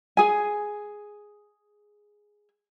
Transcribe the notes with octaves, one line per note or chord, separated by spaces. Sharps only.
G#4 G#5